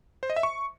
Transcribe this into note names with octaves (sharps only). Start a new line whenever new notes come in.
C5
D#5
E5
C#6